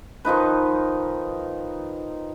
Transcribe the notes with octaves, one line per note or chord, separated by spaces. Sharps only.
D#3 F3 D#4 B4